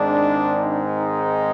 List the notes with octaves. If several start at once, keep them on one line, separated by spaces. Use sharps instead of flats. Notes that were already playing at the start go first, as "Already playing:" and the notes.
Already playing: G#2 D#3 G#3 C4 D4
D#4